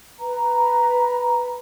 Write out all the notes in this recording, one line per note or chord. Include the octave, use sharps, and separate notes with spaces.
B4 A#5